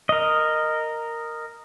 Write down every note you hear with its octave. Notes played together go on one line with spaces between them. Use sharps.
A#4 D#5